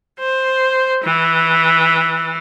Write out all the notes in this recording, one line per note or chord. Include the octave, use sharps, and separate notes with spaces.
C5
E3